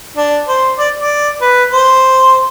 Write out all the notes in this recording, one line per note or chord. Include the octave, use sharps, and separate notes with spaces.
D4
C5
D5
D5
B4
C5